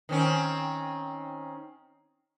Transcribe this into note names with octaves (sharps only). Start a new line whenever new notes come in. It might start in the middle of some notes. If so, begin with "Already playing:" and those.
D#3 C4 C#4